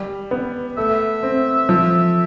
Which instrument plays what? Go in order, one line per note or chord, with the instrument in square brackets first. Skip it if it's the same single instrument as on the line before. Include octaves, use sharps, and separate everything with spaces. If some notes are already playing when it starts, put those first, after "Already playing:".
Already playing: [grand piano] G3
B3
[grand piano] A3 [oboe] E5
[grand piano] C4
F3